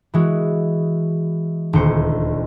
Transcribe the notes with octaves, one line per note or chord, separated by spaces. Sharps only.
E3 G#3 F#4
D#1 D2 C5 C#7